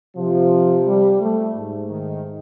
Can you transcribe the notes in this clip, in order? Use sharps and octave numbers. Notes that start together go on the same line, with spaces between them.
C3 F3
G3
A3
G#2
D#3